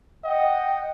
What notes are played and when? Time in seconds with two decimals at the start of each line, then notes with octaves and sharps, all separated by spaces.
0.24 D#5 F#5 G5